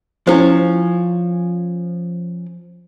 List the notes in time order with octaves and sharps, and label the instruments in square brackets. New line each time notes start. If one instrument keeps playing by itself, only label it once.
[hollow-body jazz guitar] F3 C#4 [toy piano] E4 C5